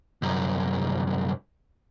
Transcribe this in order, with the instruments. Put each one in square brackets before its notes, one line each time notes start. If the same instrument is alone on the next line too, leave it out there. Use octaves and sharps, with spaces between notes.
[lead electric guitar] C2 F#2